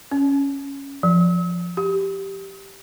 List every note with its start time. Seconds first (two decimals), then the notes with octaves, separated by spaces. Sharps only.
0.12 C#4
1.03 F3
1.77 G4